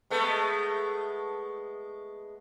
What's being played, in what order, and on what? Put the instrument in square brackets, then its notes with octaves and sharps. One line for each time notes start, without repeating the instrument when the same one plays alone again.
[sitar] G#3 A3 B3